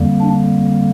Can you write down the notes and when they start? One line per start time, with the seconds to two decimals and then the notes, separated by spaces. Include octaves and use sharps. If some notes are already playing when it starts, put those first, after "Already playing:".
Already playing: F2 D3 G3 A#3
0.21 D4